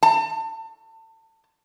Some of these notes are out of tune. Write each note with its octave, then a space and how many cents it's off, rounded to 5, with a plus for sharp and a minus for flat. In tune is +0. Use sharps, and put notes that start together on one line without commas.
A5 +30